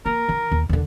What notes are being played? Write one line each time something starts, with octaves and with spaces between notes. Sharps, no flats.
A#3 A#4
D#3
D#2
D#2 D3